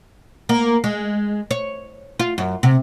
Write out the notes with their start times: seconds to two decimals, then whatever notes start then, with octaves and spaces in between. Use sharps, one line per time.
0.49 A#3
0.84 G#3
1.51 C#5
2.20 F4
2.38 F#2
2.63 C3